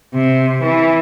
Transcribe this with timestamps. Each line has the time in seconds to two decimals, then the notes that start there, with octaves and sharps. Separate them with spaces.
0.15 C3
0.62 E3